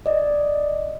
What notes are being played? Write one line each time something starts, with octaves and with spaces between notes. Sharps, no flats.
D5 D#5